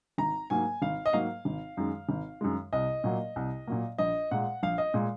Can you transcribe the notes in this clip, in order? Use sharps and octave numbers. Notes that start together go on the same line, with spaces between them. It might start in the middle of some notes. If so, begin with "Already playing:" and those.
G#1 A#5
G#2 F#3 A#3 G#5
G#1 F5
D#5
G#2 F#3 A#3 F5
G#1
F#2 D#3 G#3
G#1
F#2 D#3 G#3
C2 D#5
A#2 F#3 A#3
C2
A#2 F#3 A#3
A#1 D#5
A#2 G#3 F#5
A#1 F5
D#5
A#2 G#3